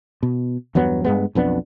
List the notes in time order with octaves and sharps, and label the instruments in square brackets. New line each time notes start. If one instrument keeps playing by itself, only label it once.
[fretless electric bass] B2
E2 G2 F#3 B3
G2 G#3 B3
B1 F2 B3 D4